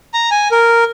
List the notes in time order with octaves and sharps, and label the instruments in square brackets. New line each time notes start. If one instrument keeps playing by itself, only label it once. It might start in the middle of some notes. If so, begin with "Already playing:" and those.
[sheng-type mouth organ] A#5
G#5
A#4